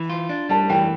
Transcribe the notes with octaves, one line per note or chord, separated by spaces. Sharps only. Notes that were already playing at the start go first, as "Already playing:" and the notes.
Already playing: E3
F4
D4
G3 A5
E3 G5